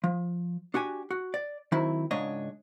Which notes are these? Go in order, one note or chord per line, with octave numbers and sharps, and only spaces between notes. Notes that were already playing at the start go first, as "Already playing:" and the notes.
F3
D4 F#4 G4 G#5
F#4
D5
D#3 F#3 C4 E4
C#2 G#2 D4 C#5 D#5